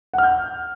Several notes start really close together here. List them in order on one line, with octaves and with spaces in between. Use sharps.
F#5 F6 G6